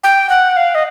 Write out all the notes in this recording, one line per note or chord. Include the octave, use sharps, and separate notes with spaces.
G5
F#5
F5
D#5